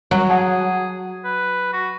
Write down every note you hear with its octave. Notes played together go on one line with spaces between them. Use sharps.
F#3 G3
G#4 F#5 A5
B4
F#4